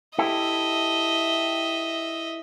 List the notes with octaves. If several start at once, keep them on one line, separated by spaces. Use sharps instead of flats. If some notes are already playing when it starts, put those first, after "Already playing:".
E4 G4 A4 D#5 E5